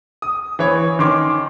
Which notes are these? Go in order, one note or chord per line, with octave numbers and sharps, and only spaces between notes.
D#6
E3 C#5
D#3 C#4 C6 D6